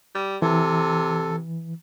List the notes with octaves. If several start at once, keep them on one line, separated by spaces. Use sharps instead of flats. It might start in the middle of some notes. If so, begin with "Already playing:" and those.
G3
C3 E3 A4